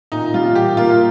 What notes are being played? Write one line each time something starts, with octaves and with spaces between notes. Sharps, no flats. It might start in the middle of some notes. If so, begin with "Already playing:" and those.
A#2 D#4
G3 F4
A#2 G4
A#3 F4